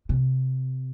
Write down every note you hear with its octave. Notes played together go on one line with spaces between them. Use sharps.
C3